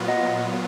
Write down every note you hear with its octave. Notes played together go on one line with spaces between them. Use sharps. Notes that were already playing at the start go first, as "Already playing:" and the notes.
Already playing: A#2 F#3 B3 F4
D#5 F#5